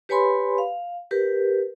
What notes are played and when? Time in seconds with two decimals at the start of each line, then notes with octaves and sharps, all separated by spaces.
0.09 G4 B4 C#5 G#5 B5 C6
0.58 F5
1.11 G4 A#4 B4